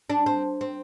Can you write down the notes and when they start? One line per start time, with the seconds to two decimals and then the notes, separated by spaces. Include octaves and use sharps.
0.10 D4
0.26 C4
0.61 C4